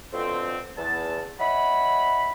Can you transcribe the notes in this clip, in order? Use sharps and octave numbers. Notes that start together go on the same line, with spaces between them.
B2 D3 F3 A3 C4
E2 A5
C#5 D#5 E5 F#5 B5